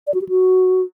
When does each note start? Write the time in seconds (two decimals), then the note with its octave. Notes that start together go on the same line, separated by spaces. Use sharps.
0.07 D5
0.14 F#4
0.21 G4
0.29 F#4